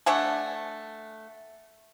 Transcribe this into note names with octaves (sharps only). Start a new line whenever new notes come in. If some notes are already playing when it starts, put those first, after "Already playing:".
A3 D4 F#5 G#5